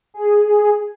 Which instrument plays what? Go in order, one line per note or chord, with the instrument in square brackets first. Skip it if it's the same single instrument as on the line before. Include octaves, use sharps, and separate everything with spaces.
[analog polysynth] G#4